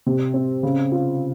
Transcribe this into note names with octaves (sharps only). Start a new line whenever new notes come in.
C3
C4
C#3
F4